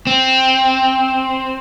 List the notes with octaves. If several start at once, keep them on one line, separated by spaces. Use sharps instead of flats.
C4